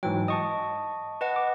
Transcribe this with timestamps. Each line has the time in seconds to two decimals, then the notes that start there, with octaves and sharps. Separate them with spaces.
0.03 G#2 E3 F#3 G5
0.28 D#5 A5 C#6 D#6
1.21 B4 D#5 F#5
1.36 D6